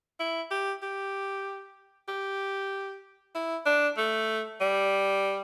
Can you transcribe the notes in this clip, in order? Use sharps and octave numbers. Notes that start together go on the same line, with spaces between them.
E4
G4
G4
G4
E4
D4
A3
G3